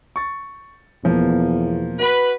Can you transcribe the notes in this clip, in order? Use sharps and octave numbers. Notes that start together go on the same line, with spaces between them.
C#6 A6
E2 B2 F3 A#3
F#4 B4 B5